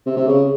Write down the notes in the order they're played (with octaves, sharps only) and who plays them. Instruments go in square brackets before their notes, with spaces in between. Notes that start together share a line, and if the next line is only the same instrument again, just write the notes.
[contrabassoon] C3
C3
C#3